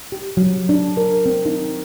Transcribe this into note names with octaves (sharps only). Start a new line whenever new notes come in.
G4
F#3
D4
A#4
C4
D#4